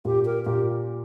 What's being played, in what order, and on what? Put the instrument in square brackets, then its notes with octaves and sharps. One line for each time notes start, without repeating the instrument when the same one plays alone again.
[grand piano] A#2 [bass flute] G4
[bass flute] A#4
[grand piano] A#2 [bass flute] G4